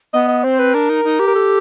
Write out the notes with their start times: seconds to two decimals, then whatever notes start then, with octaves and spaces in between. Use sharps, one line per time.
0.13 B3 D#5
0.28 D#5
0.44 C4 C5
0.59 B4
0.74 D4 A#4
0.89 D#4
1.04 D#4
1.19 G4
1.27 A#4
1.35 A4